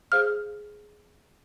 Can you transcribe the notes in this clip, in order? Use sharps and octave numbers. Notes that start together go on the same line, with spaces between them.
G#4 C5 F5 F6